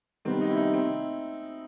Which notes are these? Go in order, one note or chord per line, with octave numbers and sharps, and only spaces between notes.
C3 D#3 G3 B3 C4
D#4
E4
D#4
C4